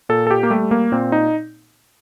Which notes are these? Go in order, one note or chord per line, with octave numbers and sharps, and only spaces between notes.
A#2 A4
A4
G4
A#3
G3 A3
A#3
A#2 C4
D#4